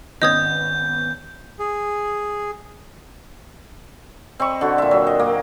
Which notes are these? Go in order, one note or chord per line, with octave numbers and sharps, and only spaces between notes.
G#1 B3 C#4 D#5 D#6 G6 G#6
G#4
C4 D#5 B5 C#6
D3 F#4
A#2 E5
F#3
D#5
A#3